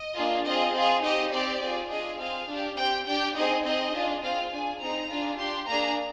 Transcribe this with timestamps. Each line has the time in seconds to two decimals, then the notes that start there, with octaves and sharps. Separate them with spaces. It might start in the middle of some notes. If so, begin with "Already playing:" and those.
Already playing: D#5
0.16 A#3 D4 F4 G#4
0.45 C4 F4 G#4 D#5
0.74 C4 F4 G#4
1.03 C4 D#4 G4 D#5
1.32 C4 G4 D5
1.61 C4 F4 G#4
1.90 D4 F4 G#4 D#5
2.19 C4 F4 G#4 F5
2.48 D4 G4
2.77 C4 G4 G5
3.06 D4 G4 G5
3.35 C4 D#4 G#4 D#5
3.64 C4 D#4 G#4 D#5
3.93 D4 F4 G#4
4.22 C4 F4 G#4 F5
4.51 D4 G#4 G#5
4.80 C4 D#4 G#4 A#5
5.09 D4 F4 G#4
5.38 D4 G4 C6
5.67 A#3 D4 G#4 A#5